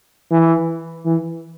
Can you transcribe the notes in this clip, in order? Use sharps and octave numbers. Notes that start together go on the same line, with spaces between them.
E3
E3